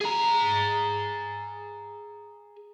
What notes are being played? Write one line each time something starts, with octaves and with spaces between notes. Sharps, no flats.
G#4 A#5